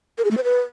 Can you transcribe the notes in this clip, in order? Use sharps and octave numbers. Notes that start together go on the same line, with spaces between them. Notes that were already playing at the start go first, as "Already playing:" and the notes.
A#4
G#4
A3
C5
B4